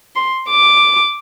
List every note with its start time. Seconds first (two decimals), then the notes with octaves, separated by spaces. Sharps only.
0.16 C6
0.49 D6